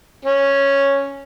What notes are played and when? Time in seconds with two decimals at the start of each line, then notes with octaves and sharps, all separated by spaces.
0.25 C#4